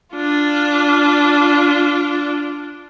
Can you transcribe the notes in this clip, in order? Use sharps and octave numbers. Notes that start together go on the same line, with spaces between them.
D4 F4